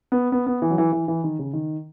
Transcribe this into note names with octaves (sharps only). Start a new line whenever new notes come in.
B3
B3
B3
E3
F#3
E3
E3
E3
D#3
C#3
D#3